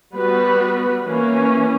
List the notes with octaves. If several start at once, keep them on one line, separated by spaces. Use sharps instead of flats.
G3 B3 F#4 B4
E3 A#3 C#4